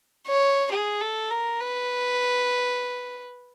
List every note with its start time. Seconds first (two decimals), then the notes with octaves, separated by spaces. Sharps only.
0.27 C#5
0.72 G#4
1.01 A4
1.31 A#4
1.60 B4